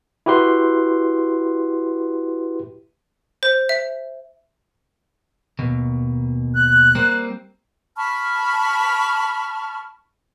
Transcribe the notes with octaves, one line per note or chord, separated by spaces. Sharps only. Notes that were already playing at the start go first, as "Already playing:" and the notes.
E4 F#4 G4 B4 C6
C5
E5
D#2 B2
F#6
G3 A#3 C4
A5 B5 C#6 F6